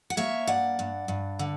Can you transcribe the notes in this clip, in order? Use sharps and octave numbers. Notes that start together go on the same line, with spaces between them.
F#5
A#3 C#5 E5
G2 D5 F#5
G2
G2
D3